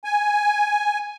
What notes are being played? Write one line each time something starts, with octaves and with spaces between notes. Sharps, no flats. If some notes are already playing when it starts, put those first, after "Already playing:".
G#5